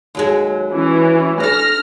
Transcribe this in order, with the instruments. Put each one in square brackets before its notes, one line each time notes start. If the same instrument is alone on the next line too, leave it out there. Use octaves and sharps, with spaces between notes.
[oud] D#2 F#3 G#3
[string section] E3 C#4
[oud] D4 A4 [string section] F6 A#6